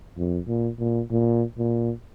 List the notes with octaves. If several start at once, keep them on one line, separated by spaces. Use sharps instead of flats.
F2
A#2
A#2
A#2
A#2